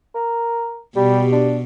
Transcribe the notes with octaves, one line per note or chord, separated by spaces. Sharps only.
A#4
B2 G3 G4
D4